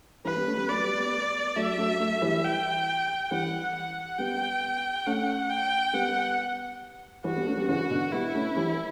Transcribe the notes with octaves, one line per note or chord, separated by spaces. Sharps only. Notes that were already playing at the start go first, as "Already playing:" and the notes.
E3 G3 B4
G3 B3
A3 C#4
G3 B3
F#3 A3 D5
G3 B3
G3 B3
F#3 A3 E5
F#3 A3
F#3 A3
E3 G3
G5
E3 G3 F#5
F#5
G3 B3 G5
A3 C#4 F#5
G5
G3 B3 F#5
E3 G3 F#4
G3 B3
A3 C#4
G3 B3
C#3 E3 F#4
B2 D3
G3 B3 E4
A3 C#4
E3 G3